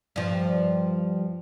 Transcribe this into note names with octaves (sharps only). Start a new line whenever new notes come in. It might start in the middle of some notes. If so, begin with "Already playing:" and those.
G2 F3